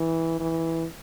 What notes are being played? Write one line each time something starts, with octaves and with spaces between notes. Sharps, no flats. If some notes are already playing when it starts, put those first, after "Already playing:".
Already playing: E3
E3